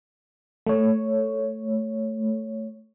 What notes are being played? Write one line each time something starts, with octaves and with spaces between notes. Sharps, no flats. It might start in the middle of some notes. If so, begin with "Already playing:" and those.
A3 C#5